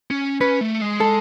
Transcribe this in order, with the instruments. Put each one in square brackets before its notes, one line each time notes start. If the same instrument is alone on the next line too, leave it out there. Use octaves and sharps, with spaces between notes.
[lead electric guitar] C#4
[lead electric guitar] C#4 [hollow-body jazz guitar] B4
[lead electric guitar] A3
G#3
[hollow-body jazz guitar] A4